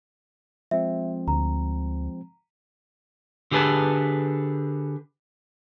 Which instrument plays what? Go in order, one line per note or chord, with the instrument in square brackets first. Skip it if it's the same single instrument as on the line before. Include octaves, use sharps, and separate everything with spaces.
[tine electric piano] F3 G#3 C4 [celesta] E5
[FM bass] D2 [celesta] A#5
[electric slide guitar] D3 G4 G#4 B4 A5